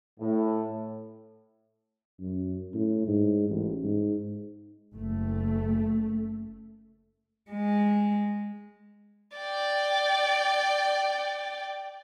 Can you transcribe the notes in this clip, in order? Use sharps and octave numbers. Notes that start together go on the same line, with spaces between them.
A2
F#2
A2
G#2
A1
G#2
F#1 A3
G#3
D5 G5